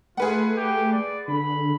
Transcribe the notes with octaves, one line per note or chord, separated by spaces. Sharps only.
A3 F4 G#4 B4 F#5
G4
D5
D3 B5